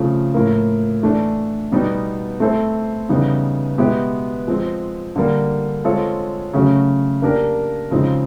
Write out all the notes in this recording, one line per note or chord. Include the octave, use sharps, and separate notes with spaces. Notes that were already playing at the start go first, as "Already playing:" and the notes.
Already playing: C#3 F3 A3 C4 F4
A2 F3 A#3
E3 A3 D4
B2 G3 B3 D#4
A3 C4 E4 A4 C5
C#3 E3 G3 B3 D#4
B2 G#3 B3 E4 G4
F3 G#3 C4
D3 G3 A#3
G#3 C4 F4 A4 C#5
C#3 F#3 A3 C#4 F#4
A#3 D4 G4 A#4
C#3 F3 G#3 C4 D#4